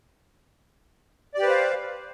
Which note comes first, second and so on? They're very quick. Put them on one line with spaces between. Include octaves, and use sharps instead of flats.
D5 G4 B4 C5 F5